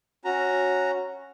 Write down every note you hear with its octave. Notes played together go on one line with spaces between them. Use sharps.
C#4 F#4 A#5